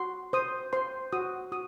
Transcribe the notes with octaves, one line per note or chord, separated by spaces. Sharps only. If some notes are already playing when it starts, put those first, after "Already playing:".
Already playing: F#4 C6
C5 D#6
C5 C6
F#4 D#6
F#4 D#6